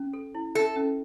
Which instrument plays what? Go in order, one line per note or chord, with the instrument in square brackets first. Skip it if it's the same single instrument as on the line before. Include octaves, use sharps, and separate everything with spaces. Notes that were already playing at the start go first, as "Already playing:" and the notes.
Already playing: [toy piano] C#4
A4
E4
[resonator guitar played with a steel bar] A4 [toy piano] E5
[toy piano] C#4